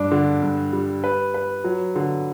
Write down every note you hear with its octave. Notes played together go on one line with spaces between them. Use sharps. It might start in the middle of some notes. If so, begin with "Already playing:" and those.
Already playing: G2 D4
D3
G2
G3
B4
B4
F#3
D3